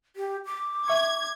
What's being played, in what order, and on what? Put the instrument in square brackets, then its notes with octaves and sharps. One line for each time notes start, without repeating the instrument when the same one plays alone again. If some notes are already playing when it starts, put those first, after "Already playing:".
[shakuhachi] G4
D6
[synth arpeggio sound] E5 C#6 [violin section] G#6